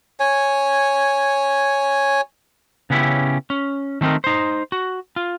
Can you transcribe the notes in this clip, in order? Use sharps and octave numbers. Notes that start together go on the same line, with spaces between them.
C#5 G#5
C#3 B3 C#4 D#4 E4 G4
C#4
D#3 A3 C4 D#4 A#4
D#4 C5
F#4
F4